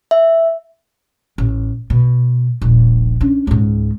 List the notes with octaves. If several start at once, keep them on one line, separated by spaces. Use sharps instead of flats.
E5
A1
B2
D#1 A#1
C#4 D4
C#2 G#2